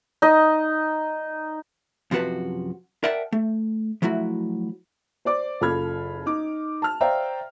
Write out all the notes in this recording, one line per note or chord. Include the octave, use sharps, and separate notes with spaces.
D#4 D#5
F#2 C3 F3 F#4 B4 A5
A#4 D5 E5 F#5 G5 A5
A3
F3 F#3 A3 E4 F#4
C5 D5 D6
F#1 F4 A4 B5 F6 G#6
D#4 D6
A5 F6
C5 D5 E5 F5 G5 A#5